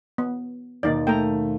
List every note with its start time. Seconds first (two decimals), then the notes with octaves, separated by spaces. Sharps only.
0.18 B3
0.83 D#2 B2 A#3 D#4 D5
1.07 A3 G5 A#5